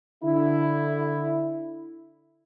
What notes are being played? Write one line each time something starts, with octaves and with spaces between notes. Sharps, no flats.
D3 E4